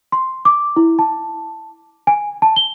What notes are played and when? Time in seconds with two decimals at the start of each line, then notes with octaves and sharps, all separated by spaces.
0.12 C6
0.45 D6
0.76 E4
0.99 A5
2.07 G#5
2.42 A5
2.56 G7